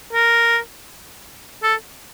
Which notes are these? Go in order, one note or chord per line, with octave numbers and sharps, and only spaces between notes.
A#4
A4